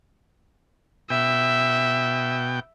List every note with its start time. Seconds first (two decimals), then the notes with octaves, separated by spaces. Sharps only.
1.10 B2 E5 G5